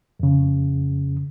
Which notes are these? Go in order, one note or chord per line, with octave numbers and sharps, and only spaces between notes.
F2 C#3